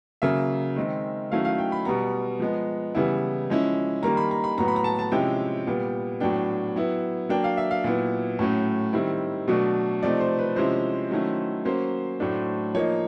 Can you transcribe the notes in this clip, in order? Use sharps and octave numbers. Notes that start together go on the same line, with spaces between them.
C#3 F#3 A#3 E5
D#3 G#3 C4
D#3 F#3 A3 C#4 E4 F5
F5
G5
B5
B2 G3 B3 A#5
F3 G#3 B3
C#3 E3 G3 B3 E4
F3 G#3 C#4 E4
D#3 G3 A#3 A#5
B5
A#5
B5
A2 F#3 B3 A#5
B5
A#5
A5
A5
C3 F3 G#3 C#4 E4 G5
A#2 G3 B3
A2 F#3 B3 D4 G5
F#3 B3 E4
F#3 A#3 D4 G5
F5
E5
F5
A#2 F#3 B3 E4
A2 F#3 A3 C#4
D#3 G3 C4 E4
B2 F#3 A3 D4
C3 F3 A3 C4 D#4 D5
C5
B4
C3 F3 G#3 C#4 E4 C5
D#3 F#3 A3 C#4 E4
F#3 A#3 C#4 C5
A2 F#3 A3 D4
F3 A#3 D#4 C#5